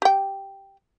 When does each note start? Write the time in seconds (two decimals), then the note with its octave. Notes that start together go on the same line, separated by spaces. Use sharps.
0.02 G4 G5